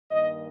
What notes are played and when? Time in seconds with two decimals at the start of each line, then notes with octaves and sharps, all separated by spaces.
0.10 G2 D#3 A#3 D#5